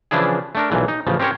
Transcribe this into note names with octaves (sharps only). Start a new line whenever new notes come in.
C#3 E3 F3 D4 E4 G#4
A3 D4 A#4
B1 A#2 E3
D#4
A1 C#3 F3
C4 C#4 G4 A#4 C5 C#5